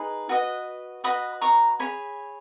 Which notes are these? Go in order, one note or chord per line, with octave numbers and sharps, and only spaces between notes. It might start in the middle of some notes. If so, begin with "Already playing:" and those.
Already playing: D#4 G#4 B4
F#4 B4 D#5
F#4 B4 D#5 B5 D#6
A#5 C#6
G#4 C#5 G#5 B5